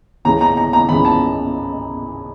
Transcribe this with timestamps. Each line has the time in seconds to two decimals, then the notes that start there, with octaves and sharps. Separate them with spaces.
0.25 C#2 C#3 E3 A#5
0.41 A#5
0.57 A#5
0.73 A#5
0.88 C#2 C#3 E3 B5
1.05 A5